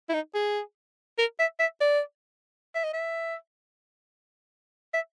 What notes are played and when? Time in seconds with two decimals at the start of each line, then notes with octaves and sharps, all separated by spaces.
0.09 E4
0.14 D#4
0.35 G#4
1.18 A#4
1.39 E5
1.60 E5
1.81 D5
2.75 E5
2.84 D#5
2.94 E5
4.94 E5